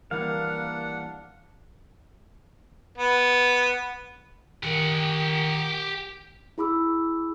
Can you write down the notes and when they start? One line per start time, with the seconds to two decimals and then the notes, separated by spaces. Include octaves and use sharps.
0.11 E3 G3 A#3 D4 A#4 F5 F#5
2.98 B3
4.63 D#3 G4 F#5
6.58 E4 G#4 B5 D6 E6